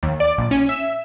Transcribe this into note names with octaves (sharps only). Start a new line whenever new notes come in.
D#2
D5
A#1
C#4
E5